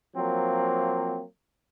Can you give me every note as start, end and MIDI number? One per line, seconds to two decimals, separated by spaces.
0.16 1.22 53
0.16 1.22 54
0.16 1.22 58
0.16 1.22 60